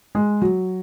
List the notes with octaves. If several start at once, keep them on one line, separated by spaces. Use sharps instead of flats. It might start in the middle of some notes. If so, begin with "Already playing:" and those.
G#3
F#3